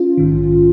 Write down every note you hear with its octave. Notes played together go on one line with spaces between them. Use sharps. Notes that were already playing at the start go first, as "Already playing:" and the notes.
Already playing: C#4 F4
A#1 G#2 D#3